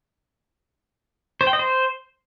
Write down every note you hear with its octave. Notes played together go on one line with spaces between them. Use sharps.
C5
G5
D#5
C5